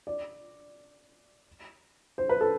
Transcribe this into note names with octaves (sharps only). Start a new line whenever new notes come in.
D5
C5
B4
A4